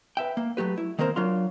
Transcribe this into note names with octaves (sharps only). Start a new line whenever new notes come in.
B4 E5 G5
A#3
F#3 A3 G4 B4
E4
D#3 A#3 C4 A#4 C5
F#3 D4 F4 A#4 F5 C6